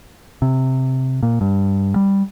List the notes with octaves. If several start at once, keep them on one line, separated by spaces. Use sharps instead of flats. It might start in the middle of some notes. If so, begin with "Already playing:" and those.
C3
A#2
G2
G3